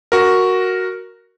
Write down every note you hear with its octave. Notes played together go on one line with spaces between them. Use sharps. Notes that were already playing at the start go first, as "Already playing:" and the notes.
F#4 A#4